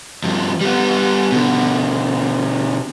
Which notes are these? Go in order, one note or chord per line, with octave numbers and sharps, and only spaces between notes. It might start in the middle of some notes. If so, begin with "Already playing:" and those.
G2 F3
G3 B3
B2 D3